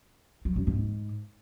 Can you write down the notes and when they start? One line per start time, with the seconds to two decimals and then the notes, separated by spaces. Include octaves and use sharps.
0.45 F#3
0.56 F#2
0.67 G#2